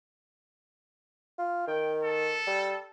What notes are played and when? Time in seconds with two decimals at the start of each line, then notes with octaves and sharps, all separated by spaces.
1.39 F4
1.68 D#3 G5
2.03 A4
2.47 G3